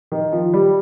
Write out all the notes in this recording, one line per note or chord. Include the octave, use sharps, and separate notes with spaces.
D#3
F3
G3